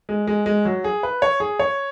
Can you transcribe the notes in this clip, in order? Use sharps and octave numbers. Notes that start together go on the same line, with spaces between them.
G#3
G#3
G#3
F#3
G#4
B4
C#5
G#4
C#5